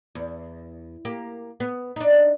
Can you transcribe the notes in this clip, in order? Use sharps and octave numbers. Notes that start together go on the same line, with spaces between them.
E2
A#3 G4
B3
D4 D#4